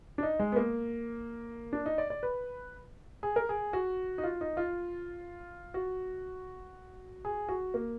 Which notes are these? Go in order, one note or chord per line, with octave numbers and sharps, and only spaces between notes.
D4
D#4
G#3
B3
A#3
D4
D#4
D5
D5
B4
G#4
A#4
G#4
F#4
D#4
F4
D#4
F4
F#4
G#4
F#4
A#3